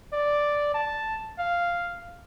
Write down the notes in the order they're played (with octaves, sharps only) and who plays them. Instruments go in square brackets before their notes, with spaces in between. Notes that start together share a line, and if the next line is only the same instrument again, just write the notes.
[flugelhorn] D5
A5
F5